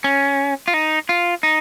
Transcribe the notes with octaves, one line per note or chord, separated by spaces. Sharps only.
C#4
F4
D#4
F4
D#4